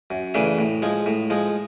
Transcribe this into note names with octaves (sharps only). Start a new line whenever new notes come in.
F#2
C#3 E3 A3 D4
A2
F3 G#3
A2
F3 G#3